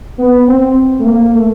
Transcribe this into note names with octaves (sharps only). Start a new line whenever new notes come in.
B3
C4
A3
A#3
A3